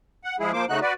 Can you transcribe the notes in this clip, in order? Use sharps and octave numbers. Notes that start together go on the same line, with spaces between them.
F#5
F3 G#3 E4 G#4
F3 A#3 C5 D6
C#3 A3 D#4 F#4 F#6
F#4 B4 D5